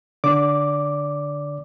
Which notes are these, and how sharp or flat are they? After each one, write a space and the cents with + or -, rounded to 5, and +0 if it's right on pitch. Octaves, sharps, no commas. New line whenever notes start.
D3 +0 D5 -25 D6 +0